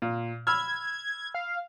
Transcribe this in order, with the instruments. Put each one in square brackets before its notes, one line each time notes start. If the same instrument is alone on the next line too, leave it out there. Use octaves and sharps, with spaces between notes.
[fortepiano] A#2
[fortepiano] B5 E6 F6 [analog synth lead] G#6
[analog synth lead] F5